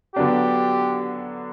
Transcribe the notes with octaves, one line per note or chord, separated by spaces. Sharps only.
D3 F#3 B3 D4 G4